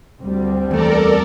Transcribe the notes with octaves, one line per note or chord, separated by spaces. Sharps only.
D2 G3 C4
E2 A3 A4 A#4 D5